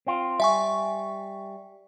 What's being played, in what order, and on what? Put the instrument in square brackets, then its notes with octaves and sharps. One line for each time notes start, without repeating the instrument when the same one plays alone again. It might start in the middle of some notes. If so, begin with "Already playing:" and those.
[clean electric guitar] C4 F4
[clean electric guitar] G3 [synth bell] E5 G#5 C#6